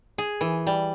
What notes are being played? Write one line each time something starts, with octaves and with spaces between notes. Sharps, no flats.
G#4
E3
G3